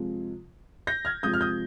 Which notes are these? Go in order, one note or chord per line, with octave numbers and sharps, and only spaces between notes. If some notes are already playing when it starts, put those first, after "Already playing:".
Already playing: C3 F3 G#3
G6 A#6
F6 G#6
C3 F3 G#3 D#6 G6
F6
D#6 G6